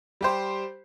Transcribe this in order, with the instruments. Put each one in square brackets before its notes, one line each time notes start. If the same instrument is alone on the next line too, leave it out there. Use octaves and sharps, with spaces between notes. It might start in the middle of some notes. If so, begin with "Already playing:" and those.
[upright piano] G3 G4 C5